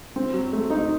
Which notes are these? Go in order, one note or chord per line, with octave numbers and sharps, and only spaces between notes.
C4
F#3
A3
D#4